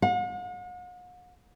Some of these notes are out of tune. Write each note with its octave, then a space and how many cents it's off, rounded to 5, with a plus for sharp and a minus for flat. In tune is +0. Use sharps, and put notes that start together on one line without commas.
F#5 -45